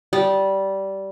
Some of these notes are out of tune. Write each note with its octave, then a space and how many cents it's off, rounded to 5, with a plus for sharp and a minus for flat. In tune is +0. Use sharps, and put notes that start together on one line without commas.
G3 -15